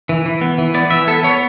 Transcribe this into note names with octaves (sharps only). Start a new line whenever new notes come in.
E3
E3
B3
E3
B3 D5
E3 E5
B3 A4
B3 C#5